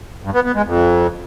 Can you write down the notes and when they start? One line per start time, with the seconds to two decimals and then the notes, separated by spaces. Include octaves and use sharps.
0.24 G2
0.34 B3
0.44 B3
0.55 G#3
0.65 F2